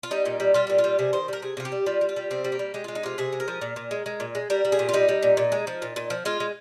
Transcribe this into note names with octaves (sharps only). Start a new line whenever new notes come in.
F4
G3 D#4
A#2
G3
G3 F4
A#2 G4
F4
G3
C3 G#4
D#3 C5
G3 A#4
C3 G#4
C3 F4
G4
G3
G3 F4
G3
F4
G3
C3 C4
G3
A#3
G3
G#3 G4
G#3 F4
D#4
C3 F4
C3 G#4
G#3
A#4
F3
A#2
A#2
G#3
G#3
A#2
G#3
G3 A#4
G3
G#4
A#2
F4
G3 D#4
G3
A#2
A#2
G#3
F3
A#2
A#2
F3
G#3 F4
G#3